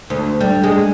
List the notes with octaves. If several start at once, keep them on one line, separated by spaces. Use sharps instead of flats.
D2
G3
G#3